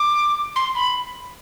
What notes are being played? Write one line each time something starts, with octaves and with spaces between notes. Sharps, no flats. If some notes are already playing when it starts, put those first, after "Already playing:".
Already playing: D6
C6
B5